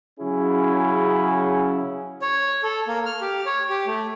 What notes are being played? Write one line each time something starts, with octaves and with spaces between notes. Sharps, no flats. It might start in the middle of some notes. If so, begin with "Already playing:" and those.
C#3 F#3 C#4 E4 G#4
C#5
A4
A#3
F6
G4
C#5
G4
A3